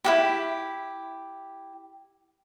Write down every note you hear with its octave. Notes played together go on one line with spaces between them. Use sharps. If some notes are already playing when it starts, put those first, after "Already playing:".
E4 F#4 G4